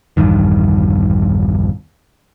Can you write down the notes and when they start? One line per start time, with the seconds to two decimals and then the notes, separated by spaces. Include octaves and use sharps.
0.17 A#1 E2 G2 D#3